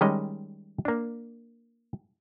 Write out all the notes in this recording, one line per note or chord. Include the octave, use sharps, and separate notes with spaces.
D#3 G3 G#3 C#4 D#5
A#3 D4